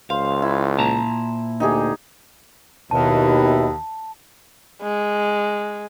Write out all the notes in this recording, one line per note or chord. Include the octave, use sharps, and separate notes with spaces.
C#2 C5 F5
E4
A#2 A5 A#5
D2 D#4 G4 G#4
D#2 B2 E4 A5
G#3